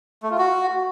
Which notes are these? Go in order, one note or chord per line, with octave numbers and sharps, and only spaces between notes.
A3
F4
F#4